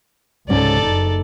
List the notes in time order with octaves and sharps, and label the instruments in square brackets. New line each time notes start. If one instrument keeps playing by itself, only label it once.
[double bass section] C#2 [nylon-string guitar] G#2 C3 C#4 [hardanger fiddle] A4 D5
[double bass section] F#1 [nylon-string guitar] D#4